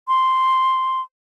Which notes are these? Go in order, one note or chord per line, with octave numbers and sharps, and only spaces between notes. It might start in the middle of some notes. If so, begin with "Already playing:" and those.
C6